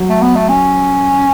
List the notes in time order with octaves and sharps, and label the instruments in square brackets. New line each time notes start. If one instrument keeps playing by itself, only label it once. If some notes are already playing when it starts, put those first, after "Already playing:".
Already playing: [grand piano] F#3
[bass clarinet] A3
B3
A3
C#4